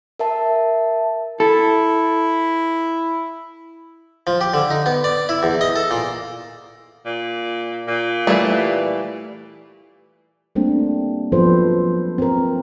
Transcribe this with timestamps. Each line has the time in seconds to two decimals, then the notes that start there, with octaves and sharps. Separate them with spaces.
0.19 A#4 E5 A5
1.40 E4 A4
4.27 F3
4.41 G4
4.54 D3
4.71 D#4
4.86 B3
5.04 D5
5.29 E4
5.43 E2
5.61 D#5
5.76 A4
5.91 A#2
7.05 A#2
7.88 A#2
8.27 E3 G3 A3
10.55 G3 A3 A#3 C4 D4
11.32 F3 F#3 B3 A4 B4 C5
12.18 C4 A#4